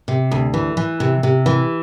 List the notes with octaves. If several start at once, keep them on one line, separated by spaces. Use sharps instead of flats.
C3
D2
E3
E3
C3
C3
E3